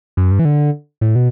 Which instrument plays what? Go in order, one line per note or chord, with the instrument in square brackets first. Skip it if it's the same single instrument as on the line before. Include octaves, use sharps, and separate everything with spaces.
[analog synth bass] F#2
G2
E3
D3
A2
B2